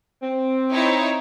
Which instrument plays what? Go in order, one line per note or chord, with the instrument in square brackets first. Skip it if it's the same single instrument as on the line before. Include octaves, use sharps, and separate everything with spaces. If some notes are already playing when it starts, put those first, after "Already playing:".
[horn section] C4
[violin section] D#4 E4 C#5